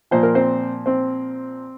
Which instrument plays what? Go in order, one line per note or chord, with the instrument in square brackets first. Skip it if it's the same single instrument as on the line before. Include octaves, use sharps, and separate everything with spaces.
[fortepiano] A#2 F3 C5
A#4
C4 C5
C4 C5